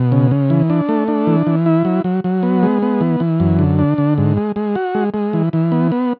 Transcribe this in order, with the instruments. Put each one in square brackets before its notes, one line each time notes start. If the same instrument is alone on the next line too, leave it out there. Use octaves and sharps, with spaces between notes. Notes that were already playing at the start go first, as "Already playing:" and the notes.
Already playing: [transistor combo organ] B2
C#3
C#3
E3
D4
A3
D4
E3
E3
E4
F#3
F#3
F#3
B3
G#3
B3
E3
E3
F#2
D3
D4
D3
G#2
G#3
G#3
F#4
G#3
G#3
E3
E3
B3
B3